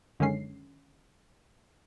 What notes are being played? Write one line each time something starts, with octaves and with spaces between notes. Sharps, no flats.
F#2 D3 D#3 G#3 C#4 C7